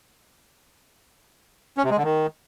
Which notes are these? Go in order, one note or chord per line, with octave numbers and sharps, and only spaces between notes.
C#4
C3
G#3
D3
D#3